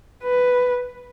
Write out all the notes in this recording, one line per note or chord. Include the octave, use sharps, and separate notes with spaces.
B4